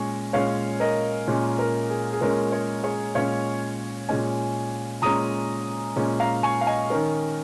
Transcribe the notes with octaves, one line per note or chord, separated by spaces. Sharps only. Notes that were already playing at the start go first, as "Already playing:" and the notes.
Already playing: A#2 G#3 C#4 G#5 C#6
A#2 G#3 C#4 C#5 F5
A#4 D#5
A#2 G#3 C#4
A#4
G#4
G#4
A#2 G#3 C#4 A#4
G#4 C#5
G#4 C#5
A#2 G#3 C#4 C#5 F5
A#2 G#3 C#4 D#5 G#5
A#2 G#3 C#4 A#5 D#6
A#2 G#3 C#4
F5 A#5
G#5 C#6
F5
D#5 G#5
D#3 C#4 A#4